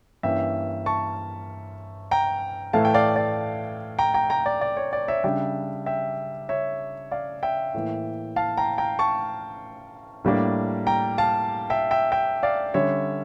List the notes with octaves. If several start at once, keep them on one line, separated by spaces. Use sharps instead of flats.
G2 E3 A#3 C#4 E5 G5
A5 C#6
G5 A#5
A2 E3 A3 F5 A5
G5
D5 F5
D5
G5 A#5
G5 A#5
G5 A#5
D5
D5
C#5
D5
C#5 E5
C#3 G3 D4 E5 G5
E5 G5
C#5 E5
D5 F5
E5 G5
A2 E3 A#3
F5 A5
G5 A#5
G5 A#5
A5 C#6
A2 G3 A#3 D4
G5 A#5
F5 A5
E5 G5
E5 G5
E5 G5
D5 F5
D3 G3 C#4 C#5 E5